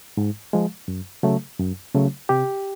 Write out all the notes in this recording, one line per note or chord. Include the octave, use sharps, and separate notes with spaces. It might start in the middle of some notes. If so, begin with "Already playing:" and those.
G#2
F3 G#3
F#2
C#3 F#3 A3
F#2
C#3 F#3 A3
C3 G4